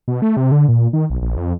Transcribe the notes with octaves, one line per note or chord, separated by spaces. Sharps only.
B2
A3
C3
D3
A#2
D#3
B1
A#1
F2